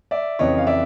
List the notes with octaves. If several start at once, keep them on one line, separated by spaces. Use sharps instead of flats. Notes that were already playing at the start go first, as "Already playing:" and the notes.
D5 E5
F2 C#3 E3 C#5 D#5
F5
D5 E5